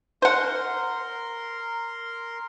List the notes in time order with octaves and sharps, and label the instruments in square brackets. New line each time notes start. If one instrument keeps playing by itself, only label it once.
[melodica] A#4 C6 [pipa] C5 F#5